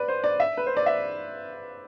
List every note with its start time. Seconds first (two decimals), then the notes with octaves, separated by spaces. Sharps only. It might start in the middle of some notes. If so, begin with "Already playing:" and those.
Already playing: B4 D5
0.08 C5
0.24 D5
0.40 E5
0.57 B4
0.67 C5
0.77 D5
0.86 E5